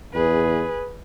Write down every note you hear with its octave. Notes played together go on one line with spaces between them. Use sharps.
E2 G#4 B4